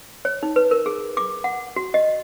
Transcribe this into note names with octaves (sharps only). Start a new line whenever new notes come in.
C#5
D#4
B4
A#4
G#4
D6
F#5
F#4
D#5